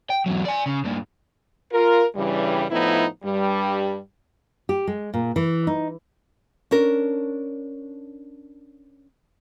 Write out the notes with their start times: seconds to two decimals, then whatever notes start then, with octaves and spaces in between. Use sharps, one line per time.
0.10 G5
0.26 E2 F#3
0.45 D5 G#5
0.66 C#3
0.84 G2 A#2
1.72 F4 A#4
2.15 G2 C#3 E3 G3
2.71 A2 F3 B3 D#4 E4
3.23 G2 G3
4.69 G4
4.87 G#3
5.14 A#2
5.36 E3
5.67 D#4
6.71 C#4 D4 A#4